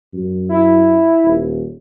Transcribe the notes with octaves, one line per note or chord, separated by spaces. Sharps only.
F#2
E4
D#1